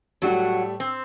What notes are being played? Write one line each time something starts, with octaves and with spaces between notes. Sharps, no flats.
A2 F#3 G3 A3 F#4
C4